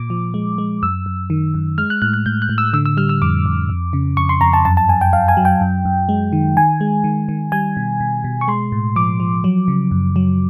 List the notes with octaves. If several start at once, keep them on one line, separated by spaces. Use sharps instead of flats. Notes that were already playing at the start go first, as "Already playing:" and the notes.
Already playing: A#2 D6
F3
G#3
G#3
F#2 E6
F#2
D#3
F#2
G#3 F6
F#6
A2 F#6
F#6
A2 G6
F#6
A2
E6
D3 E6
E6
G3 F6
E6
F2 D6
F2
F2
C#3
F2 C#6
C6
F2 A#5
A5
F#2 A5
A5
F#2 G#5
G5
F#2 F5
G#5
F#3
G5
F#2
F#2
G#3
D#3
D#3 G#5
G#3
D#3
D#3
G3 G#5
B2
B2
B2
C#6
G#3 C6
A2
F3 D6
F3
F#3
C#3
F#2
F#3